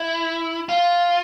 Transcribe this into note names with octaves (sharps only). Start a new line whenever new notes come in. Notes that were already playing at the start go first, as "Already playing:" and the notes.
Already playing: E4
F4